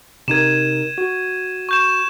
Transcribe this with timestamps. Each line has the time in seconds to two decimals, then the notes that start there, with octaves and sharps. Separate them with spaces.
0.28 C3 D#4 A#4 G#6 D#7 E7
0.98 F#4
1.69 C#6 G6 E7